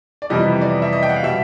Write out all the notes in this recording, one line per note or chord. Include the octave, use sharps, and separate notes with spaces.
D5
F2 C3 E3 G3 B3 D#5
D5
E5
D#5
G5
F#5
F5
B2 G3 E5